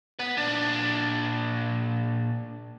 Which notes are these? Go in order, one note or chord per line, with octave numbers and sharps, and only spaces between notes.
B4 F#5
A#2 D4